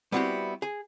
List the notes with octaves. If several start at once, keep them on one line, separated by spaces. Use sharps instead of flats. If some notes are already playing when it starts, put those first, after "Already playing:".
G3 B3 C4 E4 F#4 G4
G#4